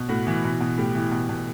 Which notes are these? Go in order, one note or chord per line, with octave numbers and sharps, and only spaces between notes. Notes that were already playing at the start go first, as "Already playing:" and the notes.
Already playing: B2
A2 F#4
E3
B2
B2
A2 G4
E3
B2
B2